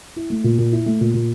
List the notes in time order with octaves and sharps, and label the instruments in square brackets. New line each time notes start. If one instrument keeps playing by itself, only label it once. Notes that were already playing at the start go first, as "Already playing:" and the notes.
[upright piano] E4
A3
A#2
A#2
E4
A3
A#2
A#2